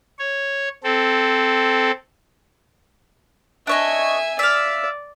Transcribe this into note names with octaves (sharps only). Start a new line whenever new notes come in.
C#5
C4 A4
D4 C#5 D#5 E5 G#5
D5 E5 F5